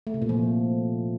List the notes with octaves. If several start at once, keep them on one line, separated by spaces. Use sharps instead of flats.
A3
C3
A#2
F3